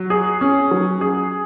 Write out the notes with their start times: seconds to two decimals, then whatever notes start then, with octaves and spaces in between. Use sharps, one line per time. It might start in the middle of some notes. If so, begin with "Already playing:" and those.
Already playing: F#3
0.10 G#4
0.41 C#4
0.71 F#3
1.01 G#4